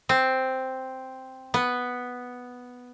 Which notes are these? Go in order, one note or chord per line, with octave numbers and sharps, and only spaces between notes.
C4
B3